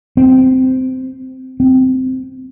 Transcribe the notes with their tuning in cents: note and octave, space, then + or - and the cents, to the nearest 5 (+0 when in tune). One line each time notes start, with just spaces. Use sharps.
C4 -15
C4 -15